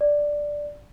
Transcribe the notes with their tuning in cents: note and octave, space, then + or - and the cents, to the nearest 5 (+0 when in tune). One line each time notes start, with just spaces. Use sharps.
D5 +0